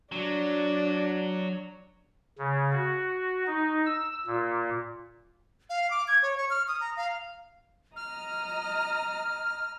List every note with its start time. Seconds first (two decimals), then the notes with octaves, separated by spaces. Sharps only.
0.12 F#3 D4
2.39 C#3
2.72 F#4
3.47 D#4
3.86 E6
4.27 A#2
5.70 F5
5.91 D6
6.08 G#6
6.23 C#5
6.38 C#6
6.50 F6
6.68 D#6
6.81 A#5
6.97 F5
7.96 D#5 A#5 F6